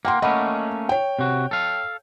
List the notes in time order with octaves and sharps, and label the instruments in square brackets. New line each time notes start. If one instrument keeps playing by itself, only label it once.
[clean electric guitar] A#3 [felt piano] F#5 G5 C6
[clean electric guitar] A3 A#3 C#4 [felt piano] D#5 F#5 B5
[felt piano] C#5 G5
[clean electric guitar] C3 F#4
A4 F5